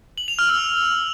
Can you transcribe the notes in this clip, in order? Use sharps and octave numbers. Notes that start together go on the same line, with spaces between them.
F#7
F7
F6
E6